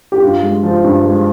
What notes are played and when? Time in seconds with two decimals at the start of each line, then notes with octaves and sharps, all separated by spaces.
0.12 G4
0.22 G2 F4
0.43 G#3
0.63 F3
0.84 G2
1.05 G#3